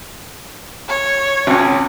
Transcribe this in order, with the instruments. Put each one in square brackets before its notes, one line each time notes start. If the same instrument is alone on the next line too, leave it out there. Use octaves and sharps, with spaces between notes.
[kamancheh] C#5
[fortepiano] G#1 C#2